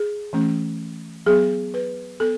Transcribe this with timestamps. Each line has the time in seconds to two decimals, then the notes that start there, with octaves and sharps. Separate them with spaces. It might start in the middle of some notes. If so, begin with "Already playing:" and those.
Already playing: G#4
0.33 E3 A3 C#4
1.26 F#3 B3 G#4
1.74 B4
2.20 B3 A4